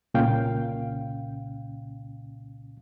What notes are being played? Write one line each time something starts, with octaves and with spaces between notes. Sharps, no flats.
C2 A#2 C#3 C#4 F5 G5